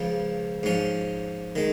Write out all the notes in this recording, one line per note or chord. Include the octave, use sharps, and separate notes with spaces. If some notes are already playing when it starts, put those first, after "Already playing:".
Already playing: C#2 C#3 F3
G#2 F3 C#4
D#3 G#3